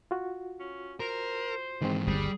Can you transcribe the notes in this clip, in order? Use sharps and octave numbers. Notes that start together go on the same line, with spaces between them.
F4 F#4
C#4
A#4 C5
G#2 D#3 E3 G#3 C4
G1 D#2 G3 G#4